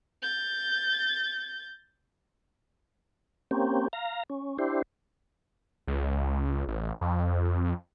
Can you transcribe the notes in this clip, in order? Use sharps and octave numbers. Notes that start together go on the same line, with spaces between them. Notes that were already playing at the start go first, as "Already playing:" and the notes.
G6 A6
A#3 C4 C#4 G4
F5 A#5
C#4
D4 E4 G4 C5
C#2
A1
F2